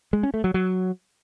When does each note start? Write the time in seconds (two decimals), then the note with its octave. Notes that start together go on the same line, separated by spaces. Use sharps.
0.13 G#3
0.23 C#4
0.34 A3
0.44 F#3
0.54 F#3